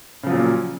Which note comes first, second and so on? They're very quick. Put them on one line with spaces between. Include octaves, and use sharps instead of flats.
C#3 F3 F#3 A#2